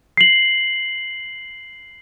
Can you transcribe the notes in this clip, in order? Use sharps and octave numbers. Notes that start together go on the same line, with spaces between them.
C7 F#7